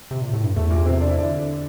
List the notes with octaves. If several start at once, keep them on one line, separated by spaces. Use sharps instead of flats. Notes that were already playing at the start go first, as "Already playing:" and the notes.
C3
A#2
A2
G2
E2 A3
A#2 A#3
C3 C4
D4
E4
D3 D4